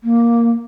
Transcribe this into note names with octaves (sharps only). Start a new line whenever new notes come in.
A#3